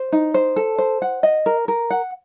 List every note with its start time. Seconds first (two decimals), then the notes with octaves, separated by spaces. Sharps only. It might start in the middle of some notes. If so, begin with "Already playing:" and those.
Already playing: C5
0.12 D#4
0.34 C5
0.56 A4
0.78 C5
1.02 F#5
1.23 D#5
1.46 A#4
1.68 A#4
1.90 F#5